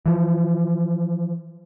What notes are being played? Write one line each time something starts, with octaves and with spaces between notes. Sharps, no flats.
E3 F3